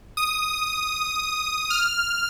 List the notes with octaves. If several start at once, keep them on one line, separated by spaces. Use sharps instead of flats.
D#6
F6